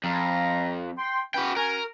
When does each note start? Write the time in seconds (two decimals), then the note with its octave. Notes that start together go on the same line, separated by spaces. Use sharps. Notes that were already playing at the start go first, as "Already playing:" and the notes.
0.04 F2 F5 A#5 B5
0.97 G5 C6
1.34 C#4 F#4 B4 G5
1.56 C#4 F#4 A#4 G#5